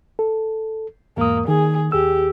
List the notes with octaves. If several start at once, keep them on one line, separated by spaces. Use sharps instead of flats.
A4
E2 G#2 A#3 D#6
D#3 G#4
D#2 G4 G#4 E6